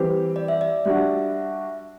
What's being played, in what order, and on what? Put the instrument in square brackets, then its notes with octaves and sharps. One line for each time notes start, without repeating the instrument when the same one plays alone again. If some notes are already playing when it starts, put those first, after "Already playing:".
Already playing: [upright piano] E3 G3 C4 G4 [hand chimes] B4
[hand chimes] D5
E5
D5
[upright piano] G3 D4 F#4 [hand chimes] E5